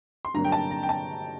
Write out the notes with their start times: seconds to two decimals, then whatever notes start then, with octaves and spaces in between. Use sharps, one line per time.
0.25 C6
0.34 G2 D3 F#3 A#3 A#5
0.45 G5
0.52 A5
0.71 A#5
0.83 G5
0.89 A5